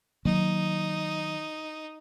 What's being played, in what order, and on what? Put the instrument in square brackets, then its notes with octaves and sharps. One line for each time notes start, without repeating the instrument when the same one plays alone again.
[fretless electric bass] D#3 F#3 A#3 [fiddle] D#4